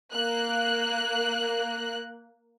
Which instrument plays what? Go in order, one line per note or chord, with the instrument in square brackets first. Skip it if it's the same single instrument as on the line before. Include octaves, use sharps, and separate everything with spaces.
[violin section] A#3 F#6